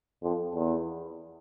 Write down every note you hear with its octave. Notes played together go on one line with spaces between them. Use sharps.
F2
E2